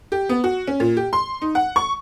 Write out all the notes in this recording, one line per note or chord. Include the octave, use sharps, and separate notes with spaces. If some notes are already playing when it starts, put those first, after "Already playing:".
G4
B3
F#4
C#4
A#2
G4
C6
D#4
F#5
C#6